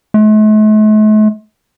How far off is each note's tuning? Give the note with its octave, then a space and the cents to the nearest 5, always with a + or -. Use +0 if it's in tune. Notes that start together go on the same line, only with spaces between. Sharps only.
A3 -45